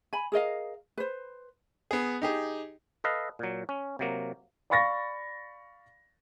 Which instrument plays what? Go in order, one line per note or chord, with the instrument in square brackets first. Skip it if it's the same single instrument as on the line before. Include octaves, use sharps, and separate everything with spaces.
[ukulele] G#5 B5
G#4 A#4 D#5 F5
B4 C5
[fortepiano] B3 G#4
D#4 G4 G#4
[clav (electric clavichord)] A4 B4 D#5 F5
A#2 F#3
C#4
C3 F#3 A#3
[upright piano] D5 F5 B5 C#6 A6 A#6